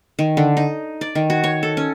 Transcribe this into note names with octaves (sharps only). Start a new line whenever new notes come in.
D#3
D3
D#4
D5
D#3
F#4
C#5
A4
C#4